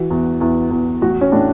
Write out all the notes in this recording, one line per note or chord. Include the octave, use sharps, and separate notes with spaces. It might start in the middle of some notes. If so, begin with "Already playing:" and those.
Already playing: E3 F#4
E2
E2
E2
A1 F#4
C#4
A2 D4